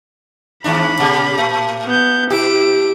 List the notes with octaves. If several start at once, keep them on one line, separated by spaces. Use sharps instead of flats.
D#2 G#2 D4 B5
A#2 C#3 G3
A2
B3 G6
B2 E4 G4 D7